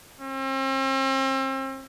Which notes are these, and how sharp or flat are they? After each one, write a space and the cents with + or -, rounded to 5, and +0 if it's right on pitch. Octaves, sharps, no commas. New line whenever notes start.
C4 +40